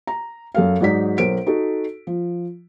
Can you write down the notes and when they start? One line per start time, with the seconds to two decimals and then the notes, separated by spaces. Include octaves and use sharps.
0.07 A#5
0.55 F#2 A4 F5
0.80 G#2 F#3 D#4 D5 B6
1.18 B1 A#4 C5 D7
1.46 D#4 F#4 A4
2.07 F3